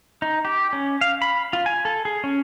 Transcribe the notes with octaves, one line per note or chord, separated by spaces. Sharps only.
D#4
G4
C#4
F5
B5
F4
G#5
A4
G#4
C#4